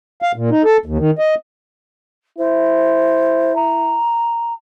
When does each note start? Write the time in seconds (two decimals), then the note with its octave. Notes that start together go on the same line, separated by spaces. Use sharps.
0.22 F5
0.36 A#2
0.51 D#4
0.65 A4
0.86 D#2
0.98 D#3
1.19 D#5
2.38 E4 C5
3.56 A#5